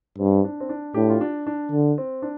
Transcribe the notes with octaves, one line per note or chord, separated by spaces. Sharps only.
G2 C4
D4
C4
D4
A2 D4 G4
F4
D4
D4
D3
C4
D4